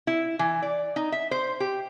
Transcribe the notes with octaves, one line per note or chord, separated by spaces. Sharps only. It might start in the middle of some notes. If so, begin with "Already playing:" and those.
E4
E3
D5
D#4
E5
C5
G4